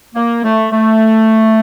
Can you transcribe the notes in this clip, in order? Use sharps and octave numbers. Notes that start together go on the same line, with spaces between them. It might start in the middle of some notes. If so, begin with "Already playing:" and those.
A#3
A3
A3